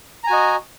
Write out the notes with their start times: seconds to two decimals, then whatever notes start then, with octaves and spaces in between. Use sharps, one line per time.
0.24 A#5
0.27 G#5
0.30 F#4
0.33 D#5